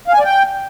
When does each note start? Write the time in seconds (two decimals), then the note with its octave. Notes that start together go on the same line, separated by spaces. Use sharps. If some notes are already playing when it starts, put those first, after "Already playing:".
0.08 F5
0.13 G#5
0.19 D5
0.25 G5